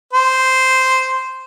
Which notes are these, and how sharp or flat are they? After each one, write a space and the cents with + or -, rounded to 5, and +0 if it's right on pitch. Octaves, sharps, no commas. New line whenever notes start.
C5 -5